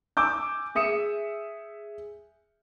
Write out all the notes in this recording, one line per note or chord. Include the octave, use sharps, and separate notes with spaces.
G#5 D6 E6 G6
G#4 E5 D#6 C#7 E7